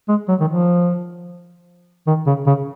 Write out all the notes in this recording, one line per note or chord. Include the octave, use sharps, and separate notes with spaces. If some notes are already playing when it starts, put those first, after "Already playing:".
G#3
F#3
D#3
F3
D#3
C#3
C#3